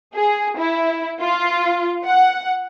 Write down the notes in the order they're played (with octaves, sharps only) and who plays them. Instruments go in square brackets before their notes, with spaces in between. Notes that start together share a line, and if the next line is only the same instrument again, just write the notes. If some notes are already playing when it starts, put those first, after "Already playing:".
[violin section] G#4
E4
F4
F#5